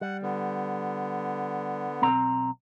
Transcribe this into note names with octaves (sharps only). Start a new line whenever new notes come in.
G3 F#5
D3 B3
B1 C4 A#5